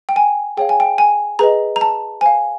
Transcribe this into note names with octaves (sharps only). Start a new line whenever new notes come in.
G5
G#5
G#4 C#5 F5 G5
G#5
G5
G#5
G#4 B4 D#5 A#5
A#5
A5
C5 F5 G#5